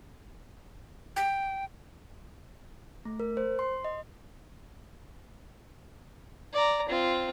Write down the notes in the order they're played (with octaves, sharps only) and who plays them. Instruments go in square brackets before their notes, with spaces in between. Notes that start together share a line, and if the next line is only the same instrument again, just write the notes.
[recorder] G5
[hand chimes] A3
A#4
C5
C6
D#5
[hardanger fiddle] D5 A#5
C4 F4